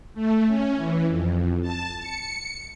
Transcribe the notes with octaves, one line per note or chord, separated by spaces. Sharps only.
A3
C#4
E3
F2
A5
C#7